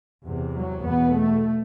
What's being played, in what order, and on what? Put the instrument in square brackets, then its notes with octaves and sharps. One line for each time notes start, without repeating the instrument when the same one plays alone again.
[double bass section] E2 C3
F#3
E2 B2 B3
A3